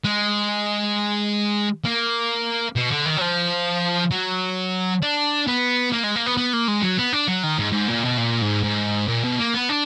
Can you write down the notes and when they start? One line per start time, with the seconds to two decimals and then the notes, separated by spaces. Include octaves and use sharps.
0.05 G#3
1.85 A#3
2.76 B2
2.90 D3
3.06 D#3
3.17 F#3
3.21 F3
4.11 F#3
5.02 D4
5.47 B3
5.92 A#3
6.03 G#3
6.15 A#3
6.26 B3
6.37 B3
6.53 A#3
6.68 G#3
6.82 F#3
6.98 B3
7.13 D4
7.28 F#3
7.44 D#3
7.59 G#2
7.73 G#2
7.88 A#2
8.04 B2
8.18 A#2
8.42 G#2
8.63 G#2
9.08 A#2
9.24 B2
9.39 A#3
9.54 B3
9.69 D4